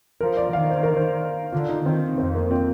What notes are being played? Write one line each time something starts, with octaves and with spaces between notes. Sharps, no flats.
F3 A#4
D5
D#3 F5
C5
A#4
C5
D3 F4
D#4
D#3 C4
F2 C4
A#3
C4